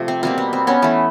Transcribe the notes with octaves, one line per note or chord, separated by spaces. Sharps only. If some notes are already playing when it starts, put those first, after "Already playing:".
Already playing: C3 F3 A3
C4
B2 G3 A#3 C4
B3
C4
B3 C#4
E3 A3 B3